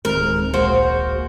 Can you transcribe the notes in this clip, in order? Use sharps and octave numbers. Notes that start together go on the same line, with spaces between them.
D1 G1 D#3 G#3 C4 A#4
A#1 A#3 F#4 G#4 C5